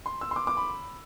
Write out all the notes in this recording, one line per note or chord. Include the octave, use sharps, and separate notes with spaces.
C6
E6
C6
D6
D6
B5